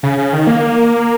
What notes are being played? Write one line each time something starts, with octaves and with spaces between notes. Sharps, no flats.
C#3
C#3
D#3
A#3